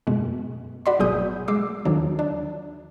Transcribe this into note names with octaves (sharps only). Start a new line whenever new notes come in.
F#2 B2 G#3
F#4 D5 B5 C6
G#1 B2 F#3 G#4 D#6 G6
G#3 D6 E6 C7
D#2 D3 D#3 F3 F#3
D4